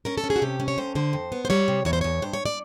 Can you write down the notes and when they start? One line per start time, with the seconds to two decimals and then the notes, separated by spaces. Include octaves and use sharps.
0.05 C#4 A#4
0.18 A4
0.24 C#4
0.30 G#4
0.36 F#4
0.42 C3 G4
0.60 C#4
0.68 C#5
0.78 F2 C5
0.95 D3 C5
1.13 F2
1.32 B3
1.45 C5
1.50 G3 C#5
1.68 C3
1.85 E2 C#5
1.93 C5
2.01 E2 C#5
2.22 G2 C5
2.33 C#5
2.46 D5